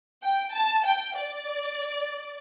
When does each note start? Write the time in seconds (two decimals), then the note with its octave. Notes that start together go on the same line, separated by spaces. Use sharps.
0.23 G5
0.54 A5
0.86 G5
1.18 D5